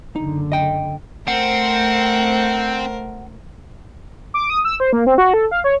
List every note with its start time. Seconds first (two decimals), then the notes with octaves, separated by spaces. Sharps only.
0.16 F#1 D3 D#4
0.52 D#5 G5
1.28 A3 C4 A#4 C5 F#5
4.34 D6
4.50 D#6
4.65 E6
4.80 C5
4.93 A#3
5.06 C4
5.18 F#4
5.34 A4
5.51 F5
5.64 C#5